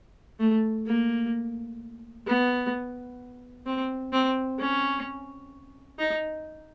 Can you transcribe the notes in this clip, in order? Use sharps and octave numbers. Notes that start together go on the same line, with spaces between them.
A3
A#3
B3
C4
C4
C#4
D#4